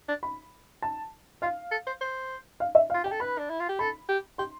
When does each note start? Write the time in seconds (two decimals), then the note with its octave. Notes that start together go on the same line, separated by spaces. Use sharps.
0.08 D4
0.23 B5
0.82 A5
1.42 F4 F5
1.71 A4
1.87 C5
2.01 C5
2.60 F5
2.75 E5
2.90 F5
2.94 F4
3.04 G4 G5
3.12 A4
3.20 B4 B5
3.38 D4
3.50 E4
3.60 F4
3.69 G4
3.79 A4 B5
4.09 G4
4.38 G4 C6